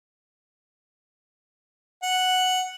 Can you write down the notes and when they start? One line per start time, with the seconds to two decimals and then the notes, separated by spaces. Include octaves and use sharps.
2.03 F#5